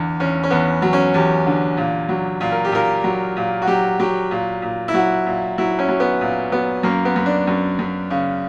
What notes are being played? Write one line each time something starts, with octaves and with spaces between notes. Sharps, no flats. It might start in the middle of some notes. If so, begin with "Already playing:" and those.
Already playing: E2 D3
E2 C#4
C#4
E2 B3
F#3
C#4
E2 G4
D3
A#2
F#3
A#2
A#4
G4
A#2 A#4
F#3
A#2
F#4
F#3 G4
F#3 G4
A#2
A#2
E4
F#3 F#4
A#2
F#3 E4
C#4
F#3
B3
A#2
F#3 B3
F#2 A#3
B3
F#2
D4
F#2
F#2
C#3